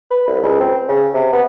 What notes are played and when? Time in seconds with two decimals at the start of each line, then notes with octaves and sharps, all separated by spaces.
0.11 B4
0.28 C2
0.42 C#2
0.61 C4
0.89 C#3
1.14 C3
1.33 B3